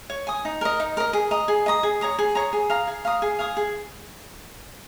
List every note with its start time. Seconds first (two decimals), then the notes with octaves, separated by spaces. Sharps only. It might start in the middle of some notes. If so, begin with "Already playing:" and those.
0.10 C#5
0.27 G#5 D#6
0.45 D#4
0.61 A#4 D#5
0.80 D#4
0.97 A#4 D#5
1.13 G#4
1.31 D#5 A#5 D#6
1.48 G#4
1.66 D#5 A#5 D#6
1.83 G#4
2.01 C#5 A#5 D#6
2.19 G#4
2.35 C#5 A#5 D#6
2.53 G#4
2.70 F5 A#5 D#6
2.87 G#4
3.05 F5 A#5 D#6
3.22 G#4
3.39 F5 G#5 D#6
3.57 G#4